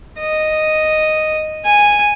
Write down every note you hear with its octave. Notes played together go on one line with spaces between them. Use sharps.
D#5
G#5